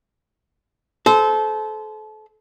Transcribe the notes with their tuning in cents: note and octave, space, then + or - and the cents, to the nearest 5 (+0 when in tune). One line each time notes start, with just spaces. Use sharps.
A4 -30 C5 -15